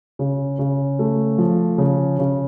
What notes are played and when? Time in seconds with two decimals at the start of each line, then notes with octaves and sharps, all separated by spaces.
0.19 C#3
0.59 C#3
0.99 A3
1.38 F3
1.78 C#3
2.19 C#3